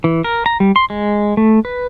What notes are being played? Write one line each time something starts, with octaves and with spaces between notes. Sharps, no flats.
E3
A#4
A#5
G3
C6
G#3
A3
B4